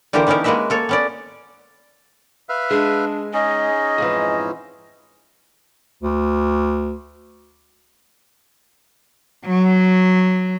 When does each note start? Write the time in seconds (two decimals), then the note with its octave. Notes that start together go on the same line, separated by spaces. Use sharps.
0.13 D3 E3 A#3 G4 A#4 C5
0.27 E3 B3 C#4 D#4 A#4
0.44 G#3 A#3 F#4 B4 D#5 E5
0.70 A#3 A4 C#5
0.89 B3 C#4 D5
2.49 B4 E5 F5
2.71 G#3 D4
3.33 C#4 D#4 G#4 D#5
3.98 F2 G#2 E3
6.03 D2
9.46 F#3